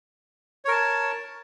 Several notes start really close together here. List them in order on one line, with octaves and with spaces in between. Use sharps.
C#5 A#4 A5